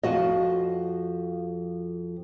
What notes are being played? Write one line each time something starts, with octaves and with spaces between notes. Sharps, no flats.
F2 F3 F#4 D#5